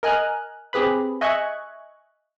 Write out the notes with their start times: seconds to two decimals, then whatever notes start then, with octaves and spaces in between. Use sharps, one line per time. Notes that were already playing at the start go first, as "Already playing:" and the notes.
0.03 A#4 D#5 G#5 F6 F#6
0.73 C4 G4 G#4 B4 B5
1.21 D#5 E5 G#5 C#6 F#6 G#6